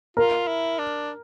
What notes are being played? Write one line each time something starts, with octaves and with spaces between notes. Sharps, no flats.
F4 A#4
E4
D4